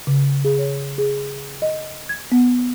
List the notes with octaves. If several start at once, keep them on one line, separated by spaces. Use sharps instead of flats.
C#3
G#4
C#5
G#4
D#5
G#6
B3